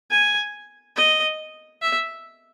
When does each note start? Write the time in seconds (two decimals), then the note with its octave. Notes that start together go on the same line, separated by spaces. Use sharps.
0.11 G#5
0.97 D#5
1.82 E5